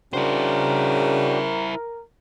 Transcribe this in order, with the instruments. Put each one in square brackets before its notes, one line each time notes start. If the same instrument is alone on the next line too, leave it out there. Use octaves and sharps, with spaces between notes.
[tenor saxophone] C#3 [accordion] D4 F#4 G5 [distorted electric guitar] E4 C5 [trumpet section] A#4